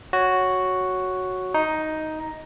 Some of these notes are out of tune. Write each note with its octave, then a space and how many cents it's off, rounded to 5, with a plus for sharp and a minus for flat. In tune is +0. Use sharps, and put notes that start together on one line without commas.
F#4 +0 C#5 +0
D#4 +5 A#5 +0